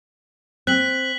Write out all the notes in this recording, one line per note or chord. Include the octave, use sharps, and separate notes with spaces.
C4 F#6 B6 F#7